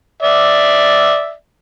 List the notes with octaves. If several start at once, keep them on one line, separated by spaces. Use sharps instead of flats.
D5 E5